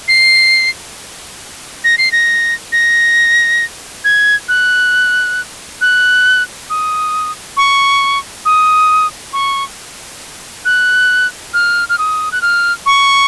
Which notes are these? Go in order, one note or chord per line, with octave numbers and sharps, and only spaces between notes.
C7
A#6
C7
A#6
A#6
G#6
F#6
F#6
D#6
C#6
D#6
C#6
F#6
F6
F6
D#6
F#6
F6
C#6